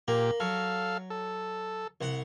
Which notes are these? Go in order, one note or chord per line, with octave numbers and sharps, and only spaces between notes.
A#2 A#3 G4
F#3 A4 F5
A4
C2 F#5